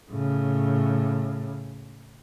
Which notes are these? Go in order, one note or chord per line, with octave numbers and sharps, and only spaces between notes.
A2 C#3